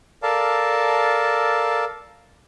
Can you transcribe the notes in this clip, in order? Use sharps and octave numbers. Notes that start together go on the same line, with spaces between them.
A4 A#4 D5 F5 A5